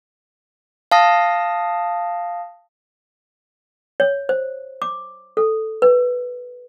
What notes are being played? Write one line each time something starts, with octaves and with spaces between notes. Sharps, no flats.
F5 A5 D#6 A#6
C#5
C5
D6
A4
B4